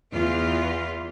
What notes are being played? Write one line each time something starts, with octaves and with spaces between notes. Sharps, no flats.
E2 F4